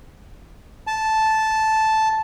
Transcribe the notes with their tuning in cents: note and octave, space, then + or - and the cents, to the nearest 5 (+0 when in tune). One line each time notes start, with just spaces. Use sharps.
A5 -5